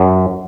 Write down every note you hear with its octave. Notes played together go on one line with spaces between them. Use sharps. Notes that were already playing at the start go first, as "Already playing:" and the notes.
Already playing: F#2